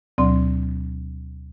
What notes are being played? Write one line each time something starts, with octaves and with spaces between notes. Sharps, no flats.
D2 B2 F#3 C4 D5 C6